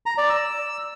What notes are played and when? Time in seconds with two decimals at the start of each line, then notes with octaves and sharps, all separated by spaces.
0.06 A#5
0.18 D5
0.30 E6